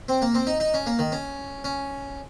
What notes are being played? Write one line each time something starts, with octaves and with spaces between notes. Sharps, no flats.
C4
A#3
C4
D#4
D#4
C#4
A#3
D#3
C#4
C#4